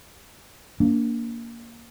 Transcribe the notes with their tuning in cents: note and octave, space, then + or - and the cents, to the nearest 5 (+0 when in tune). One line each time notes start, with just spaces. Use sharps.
A#3 +0 D4 -30